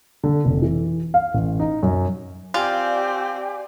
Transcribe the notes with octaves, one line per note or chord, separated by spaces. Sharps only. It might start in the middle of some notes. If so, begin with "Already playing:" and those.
D3
F1
E3
F5
A1
D#4
F#2
C4 F4 G4 D5 F5 G#5